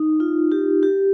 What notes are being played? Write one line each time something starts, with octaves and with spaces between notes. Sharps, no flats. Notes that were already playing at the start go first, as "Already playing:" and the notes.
Already playing: D#4
F4
G4
G4